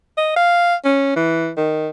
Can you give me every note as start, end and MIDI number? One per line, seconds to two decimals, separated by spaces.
0.18 0.32 75
0.36 0.75 77
0.84 1.15 61
1.16 1.51 52
1.57 1.89 51